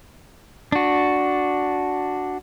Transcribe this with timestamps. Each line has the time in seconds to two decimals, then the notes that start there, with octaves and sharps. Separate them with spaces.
0.72 D4 F#4